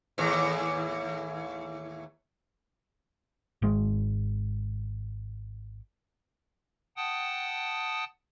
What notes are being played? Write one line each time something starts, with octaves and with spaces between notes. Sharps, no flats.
D#2 A2 E3
G#1 G#3
F#5 G5 A5 D#6